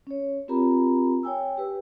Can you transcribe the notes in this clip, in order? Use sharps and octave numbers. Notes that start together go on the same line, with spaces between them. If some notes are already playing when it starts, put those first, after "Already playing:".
C#4 C#5
C4 F4 G4 A#4 A#5 B5
C#5 G5 G#5 E6
G4 B4